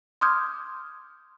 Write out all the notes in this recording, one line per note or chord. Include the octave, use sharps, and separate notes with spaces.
C6 D6 D#6 F6 G6 G#6